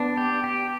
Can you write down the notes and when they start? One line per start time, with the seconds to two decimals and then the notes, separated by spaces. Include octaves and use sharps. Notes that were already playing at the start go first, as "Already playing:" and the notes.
Already playing: B3 D4
0.17 G4
0.44 G4